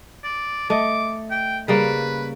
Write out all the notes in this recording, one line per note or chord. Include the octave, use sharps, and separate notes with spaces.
D5
A3 D#5 D6
G5
C#3 G3 A#3 B4